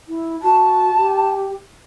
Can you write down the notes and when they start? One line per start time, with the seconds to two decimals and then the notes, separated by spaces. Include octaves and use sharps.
0.08 E4
0.42 F#4 A5
0.97 G4